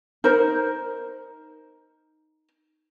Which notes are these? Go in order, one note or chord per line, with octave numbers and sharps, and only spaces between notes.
D#4 A#4 C5